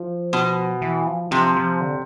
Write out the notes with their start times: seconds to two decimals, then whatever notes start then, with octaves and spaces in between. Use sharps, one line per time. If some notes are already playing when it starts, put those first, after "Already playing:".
Already playing: F3
0.33 B2
0.82 E3
1.07 F3
1.31 C3 F3
1.57 F3
1.81 D3